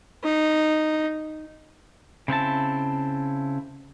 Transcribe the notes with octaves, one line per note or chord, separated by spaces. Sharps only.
D#4
C#3 C4 E4 A5